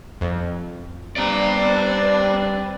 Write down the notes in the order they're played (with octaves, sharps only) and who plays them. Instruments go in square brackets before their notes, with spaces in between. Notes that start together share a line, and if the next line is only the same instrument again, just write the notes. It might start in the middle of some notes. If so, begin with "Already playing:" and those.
[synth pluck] F2
[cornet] G3 [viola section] C4 D4 B4 [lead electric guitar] D5 A#5